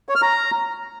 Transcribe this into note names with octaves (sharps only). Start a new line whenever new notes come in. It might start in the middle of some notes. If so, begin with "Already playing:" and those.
C#5
F6
A#5